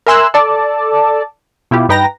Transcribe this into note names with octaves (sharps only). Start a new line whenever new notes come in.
A#4 E5 G#5 C6 E6 F#6
A4 D5 A5
B2 E4 F4 G4
G2 D#4 B4 G5 A#5 A#6